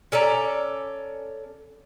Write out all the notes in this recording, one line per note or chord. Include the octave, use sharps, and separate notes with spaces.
C#4 A4 D5 A#5